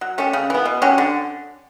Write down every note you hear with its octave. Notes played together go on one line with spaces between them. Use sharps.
F#3
A3 C#4 G4
C#3
E3 B3
B2
F#3 C#4 G4
D3